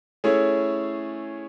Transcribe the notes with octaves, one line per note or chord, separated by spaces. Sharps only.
A3 C#4 E4 G#4 C#5